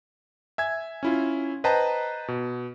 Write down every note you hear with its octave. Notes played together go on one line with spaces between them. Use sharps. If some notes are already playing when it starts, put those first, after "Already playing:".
E5 G#5 G#6
C#4 E4 F4
B4 C5 D#5 G5 A5 A#5
B2